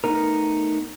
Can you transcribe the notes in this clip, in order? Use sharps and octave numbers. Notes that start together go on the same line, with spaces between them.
A3 B3 D#4 A#4